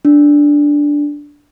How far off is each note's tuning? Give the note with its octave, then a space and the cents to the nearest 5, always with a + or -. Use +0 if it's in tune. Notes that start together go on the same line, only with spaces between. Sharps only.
D4 -5